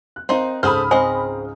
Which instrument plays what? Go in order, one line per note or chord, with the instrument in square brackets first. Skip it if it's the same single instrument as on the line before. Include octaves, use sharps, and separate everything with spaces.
[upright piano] F#6
[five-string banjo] C4 D#4 [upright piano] A#4 F5 C6
[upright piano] C#2 G#2 [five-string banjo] G#4 A4 C5 [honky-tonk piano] B5 D#6 F6
[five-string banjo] C4 D#5 [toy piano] C5 G#5